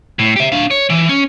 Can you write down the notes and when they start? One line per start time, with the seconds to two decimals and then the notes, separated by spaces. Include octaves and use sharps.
0.19 A2
0.36 G4 E5
0.52 D4 F5
0.71 C#5
0.90 E3
1.09 C#4